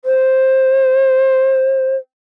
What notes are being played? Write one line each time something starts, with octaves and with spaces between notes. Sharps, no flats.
C5